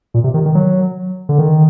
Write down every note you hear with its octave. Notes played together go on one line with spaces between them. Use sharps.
A#2
C3
D#3
D#3
F#3
D3
D#3